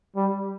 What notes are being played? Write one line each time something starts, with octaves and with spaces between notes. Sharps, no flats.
G3